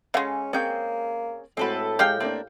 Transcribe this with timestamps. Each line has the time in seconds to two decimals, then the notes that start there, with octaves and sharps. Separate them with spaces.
0.14 C#3 G#3 C#4 A4 F5 F#5
0.53 A#3 C4 C#4 G#4 G5 G6
1.57 A2 G#3 A3 C4 F#4 A4 B4
1.99 G#3 G4 G#4 F5 G5
2.20 A3 A#3 C4 D4